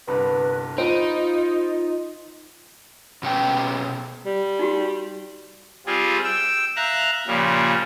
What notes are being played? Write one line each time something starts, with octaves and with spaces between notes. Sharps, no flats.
G1 C2 G2 B4
D#4 F4 C5 B5 D7
B2 C#4 G5
G3
D#4 F#4 G4
G3 C4 F4 G#4
G5 E6
E5 F5 A#5 F#6
A#2 C#3 F3 G3